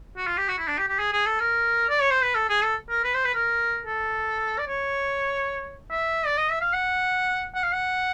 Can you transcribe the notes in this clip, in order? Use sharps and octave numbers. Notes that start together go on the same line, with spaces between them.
F#4
F4
G4
F#4
E4
D4
G4
G4
G#4
G#4
A4
A#4
D5
C#5
C5
B4
A4
G#4
A4
A#4
B4
C5
B4
A#4
A4
D5
C#5
E5
D5
D#5
E5
F5
F#5
F#5
F5
F#5